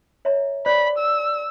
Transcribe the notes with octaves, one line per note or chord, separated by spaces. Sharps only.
C#5 E5 A#5
C5 D5 B5
E6